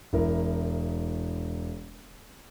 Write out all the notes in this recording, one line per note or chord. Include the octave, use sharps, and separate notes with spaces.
E1 E4 A#4